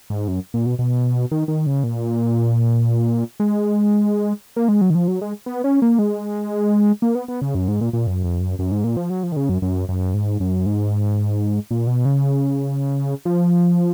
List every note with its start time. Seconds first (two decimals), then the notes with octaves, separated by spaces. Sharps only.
0.10 G#2
0.28 F#2
0.54 A#2
0.66 B2
0.79 B2
1.31 D#3
1.48 D#3
1.66 C#3
1.84 A#2
3.40 G#3
4.56 A#3
4.68 G#3
4.81 F#3
4.90 D#3
4.95 F3
5.08 F#3
5.21 G#3
5.46 B3
5.64 C#4
5.82 A#3
5.99 G#3
7.02 A#3
7.15 B3
7.28 B3
7.41 C#3
7.55 F#2
7.68 G#2
7.81 A#2
7.93 A#2
8.07 F#2
8.24 F2
8.40 F#2
8.59 F#2
8.72 G#2
8.84 A#2
8.97 F3
9.10 F#3
9.23 F3
9.32 D#3
9.36 C#3
9.49 F#2
9.62 F#2
9.89 F#2
10.14 G#2
10.40 F#2
10.66 G#2
11.71 A#2
11.87 B2
12.05 C#3
13.25 F3